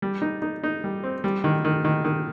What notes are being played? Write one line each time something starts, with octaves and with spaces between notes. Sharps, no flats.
G3
D#4
D#4
D#4
G3
C4
G3
D#3
D#3
D#3
D#3